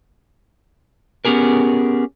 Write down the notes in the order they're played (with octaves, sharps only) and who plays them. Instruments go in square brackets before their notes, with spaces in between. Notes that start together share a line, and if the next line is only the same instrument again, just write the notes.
[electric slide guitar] B3 C#4 G4 G#4 A#4